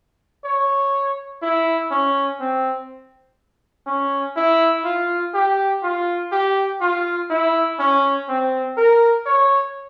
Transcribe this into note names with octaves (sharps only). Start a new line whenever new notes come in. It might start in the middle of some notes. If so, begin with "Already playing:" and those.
C#5
E4
C#4
C4
C#4
E4
F4
G4
F4
G4
F4
E4
C#4
C4
A#4
C#5